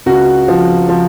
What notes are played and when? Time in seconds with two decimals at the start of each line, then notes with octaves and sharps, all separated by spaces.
0.06 C#2 F#4
0.48 F3
0.89 F3